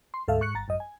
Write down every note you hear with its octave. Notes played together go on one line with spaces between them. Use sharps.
C6
D2 G#2 A4 E5 F5
G#2 C#6 F#6 C#7
G1 A#5 A6
G#1 F#2 D#5
G#5